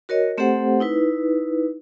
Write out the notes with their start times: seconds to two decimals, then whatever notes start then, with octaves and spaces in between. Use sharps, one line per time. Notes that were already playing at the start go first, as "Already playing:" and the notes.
0.09 F#4 A#4 C#5 D#5
0.38 A3 C4 G4 A4 C5 F#5
0.80 D#4 E4 B4